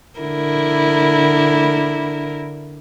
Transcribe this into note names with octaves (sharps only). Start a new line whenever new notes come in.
D3 E4 A#4